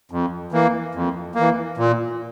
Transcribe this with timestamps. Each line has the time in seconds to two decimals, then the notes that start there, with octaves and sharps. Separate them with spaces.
0.11 F2
0.52 E3 A#3
0.95 F2
1.35 A#3
1.40 E3
1.77 A#2